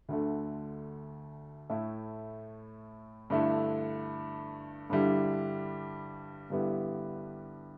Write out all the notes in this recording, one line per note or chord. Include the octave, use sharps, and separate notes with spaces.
D2 D3 A3
A2 A3 E4
G2 D3 A3 E4
G2 D3 G3 E4
G2 D3 G3 B3 E4